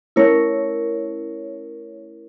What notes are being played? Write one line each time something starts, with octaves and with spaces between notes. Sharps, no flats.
A3 C#4 E4 A#4 C#5